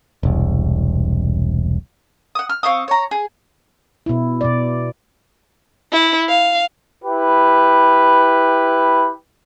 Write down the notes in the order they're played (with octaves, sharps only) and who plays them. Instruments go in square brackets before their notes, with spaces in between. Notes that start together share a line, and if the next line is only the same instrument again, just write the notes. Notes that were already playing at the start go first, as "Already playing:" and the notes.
[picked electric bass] E1 C2
[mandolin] F#5 D#6
F6
C4 F5 C#6 D#6
C#5 A#5
G#4
[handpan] B2 E4
B2 D5
[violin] E4
F5
[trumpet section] E4 G4 B4